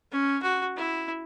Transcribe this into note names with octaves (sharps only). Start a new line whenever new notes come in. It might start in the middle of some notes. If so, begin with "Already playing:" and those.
C#4
F#4
E4